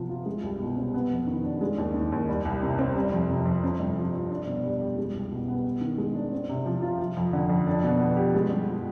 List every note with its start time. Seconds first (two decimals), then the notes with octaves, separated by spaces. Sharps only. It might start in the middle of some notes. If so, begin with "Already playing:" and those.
Already playing: C3 F3 B3
0.09 F4
0.26 G#3
0.44 C2
0.60 B2
0.77 C4
0.94 B3
1.11 F2
1.27 D#3
1.44 D4
1.61 G#3
1.78 D#2
1.94 D#3
2.12 D#2
2.29 G3
2.45 C2
2.63 C3
2.79 C4
2.96 G3
3.12 F2
3.30 C3
3.46 F2
3.64 C4
3.80 G2
3.97 F3
4.13 G2
4.30 D4
4.46 B2
4.64 G3
4.81 G4
4.97 G#3
5.14 C2
5.32 B2
5.48 B3
5.65 B3
5.81 D#3
5.98 G#3
6.15 D4
6.32 C4
6.49 C3
6.66 F3
6.82 F4
6.99 F3
7.17 F2
7.33 D3
7.49 F2
7.67 D4
7.84 B2
8.00 B3
8.17 G4
8.35 G#3
8.50 G2
8.68 F3